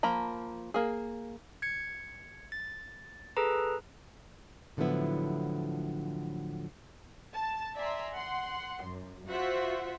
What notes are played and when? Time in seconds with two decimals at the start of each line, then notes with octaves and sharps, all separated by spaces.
0.03 F3 A#3 A#5 B5
0.74 A#3 G#4
1.62 G#6 C#7
2.52 A6
3.37 G#4 A4 B4 A#5
4.77 A2 D3 F3 F#3 B3 E4
7.32 A5
7.76 D5 E5 G#5 A#5 C6
8.14 F#5 C6
8.87 F#2
9.28 F4 F#4 C5 E5 F#5